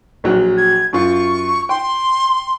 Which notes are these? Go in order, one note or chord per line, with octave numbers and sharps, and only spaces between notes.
A#1 F#3
G#6
F#2 F4 C#6
G5 C6